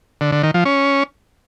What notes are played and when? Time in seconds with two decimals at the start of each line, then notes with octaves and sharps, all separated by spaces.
0.21 D3
0.32 D3
0.43 D#3
0.54 F3
0.65 C#4